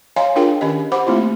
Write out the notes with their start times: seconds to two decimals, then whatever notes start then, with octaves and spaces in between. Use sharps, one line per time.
0.16 C#5 D#5 F5 G#5 A#5 C6
0.36 D4 F4 G#4 A#4 G5
0.61 D#3 C#4 G4 D#5
0.92 G4 C5 F#5 B5 D6
1.07 A3 A#3 C4 E4 F4